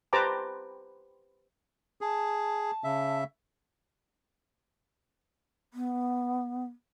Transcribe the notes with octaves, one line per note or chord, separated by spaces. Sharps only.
G4 B4 C5 A5 A#5 D6
G#4 A5
C#3 E5
B3